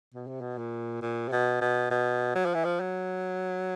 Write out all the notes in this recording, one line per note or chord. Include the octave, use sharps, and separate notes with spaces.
B2
C3
B2
A#2
A#2
C3
B2
B2
B2
F#3
F3
E3
F3
F#3